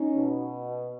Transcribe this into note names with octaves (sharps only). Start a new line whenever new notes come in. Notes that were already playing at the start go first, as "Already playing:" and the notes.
Already playing: C#4 D#4
B2